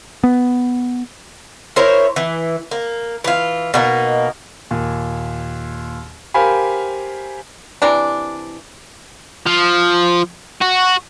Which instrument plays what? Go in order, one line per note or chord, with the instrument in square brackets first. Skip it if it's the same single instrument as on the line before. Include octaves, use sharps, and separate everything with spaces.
[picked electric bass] B3
[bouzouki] E4 A#4 C5 C#5
E3
A#3
E3 F4
B2 A#3 D#4
[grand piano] D#2 A#2
G4 A#4 C5 F5 G#5 B5
[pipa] C3 E3 D4
[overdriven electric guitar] F3
F#4